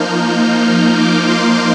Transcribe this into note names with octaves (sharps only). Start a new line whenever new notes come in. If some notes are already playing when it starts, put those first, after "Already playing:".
Already playing: F3 A#3 D#4 F6 G6
G6
F6
D6
C6